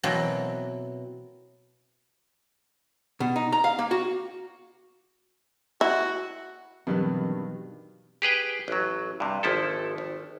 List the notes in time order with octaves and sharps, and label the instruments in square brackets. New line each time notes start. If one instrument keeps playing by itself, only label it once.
[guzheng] B2 E3 F#3 A#3 C4
[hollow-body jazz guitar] B2
D#4
A#5
F5
A#3
F#4
[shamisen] E4 [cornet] F#4
[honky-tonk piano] G2 [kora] B2 D#3 B4 [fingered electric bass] E3 C4 [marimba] F#3
[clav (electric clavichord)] G4 G#4 B4 G5
A1 F#3
G2 C3
G#1 F3 E4 A4
G#1